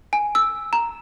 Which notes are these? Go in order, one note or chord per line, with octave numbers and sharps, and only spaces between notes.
G#5
E6
A#5